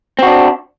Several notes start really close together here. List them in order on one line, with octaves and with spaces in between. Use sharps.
C4 F#4 D4